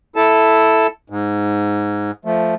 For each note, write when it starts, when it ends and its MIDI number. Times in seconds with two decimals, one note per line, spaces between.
0.16 0.87 64
0.16 0.87 69
0.16 0.87 81
1.10 2.11 44
2.25 2.55 53
2.25 2.55 57